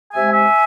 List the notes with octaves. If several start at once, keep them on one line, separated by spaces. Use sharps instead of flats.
C3 G#3 E5 G#5
E5 G#5